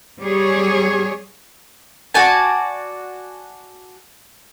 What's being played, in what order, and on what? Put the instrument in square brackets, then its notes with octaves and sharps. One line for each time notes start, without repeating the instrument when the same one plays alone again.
[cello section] G3 G#4 C#5
[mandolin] F#4 D5 G#5 A5